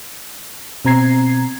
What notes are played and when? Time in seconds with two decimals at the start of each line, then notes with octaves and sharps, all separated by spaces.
0.85 B2 C4 A#5 G#6 C7